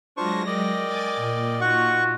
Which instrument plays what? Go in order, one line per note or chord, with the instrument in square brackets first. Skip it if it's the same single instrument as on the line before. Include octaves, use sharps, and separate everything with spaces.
[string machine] F#3 G#3 A#6 [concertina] D4 C5 C#6 [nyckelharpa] F4
[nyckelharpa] A#4 G5 [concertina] D5 D#5
[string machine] G#5 D6 A6
A#2
[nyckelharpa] D#4 F4 [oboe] F#4 [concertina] F#5 C#6